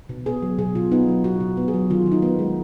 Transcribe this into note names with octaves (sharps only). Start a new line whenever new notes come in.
B2
B3 G#4
F#3
B2 G#4
B2 F4
B3 D#4
F#3
B2 F#4
B2
B3
G#4
F#3
D#3 F4
D#3
D#4
B3
G#3